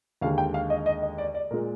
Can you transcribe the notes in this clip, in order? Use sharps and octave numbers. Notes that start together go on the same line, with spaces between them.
D#2 D3 G#3 F5
G5
F5
D#5
D#5
D#5
D5
D5
A#2 G#3 A#4